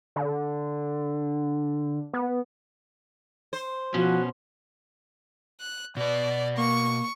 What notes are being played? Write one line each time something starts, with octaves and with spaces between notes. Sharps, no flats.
D3
B3
C5
B2 F3 C#4 F#4
F#6
B2 B4 D5
A#3 C#6